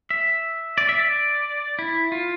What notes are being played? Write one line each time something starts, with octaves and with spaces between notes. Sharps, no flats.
E5
D5
E5
D5
E4
F4